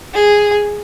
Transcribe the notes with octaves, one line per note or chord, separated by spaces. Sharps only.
G#4